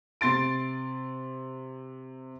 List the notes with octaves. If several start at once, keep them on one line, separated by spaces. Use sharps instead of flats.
C3 C6 A6 D7